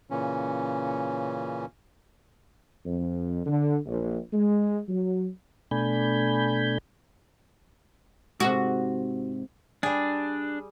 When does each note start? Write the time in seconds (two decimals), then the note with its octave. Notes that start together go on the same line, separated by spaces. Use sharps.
0.10 A#2 C#3 E3 C#4
2.86 F2
3.46 D3
3.86 A#1
4.33 G#3
4.89 F#3
5.71 B2 A3 D4 G#5 B5 G6
8.40 G#2 C3 F#4
9.83 G3 D4 G#4